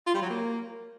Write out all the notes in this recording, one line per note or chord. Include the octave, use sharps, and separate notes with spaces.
F4
G3
F#3
A#3